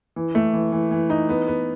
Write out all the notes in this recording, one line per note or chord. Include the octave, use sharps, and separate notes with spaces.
E3
A3
E3
E3
E3
D#4
B3
B3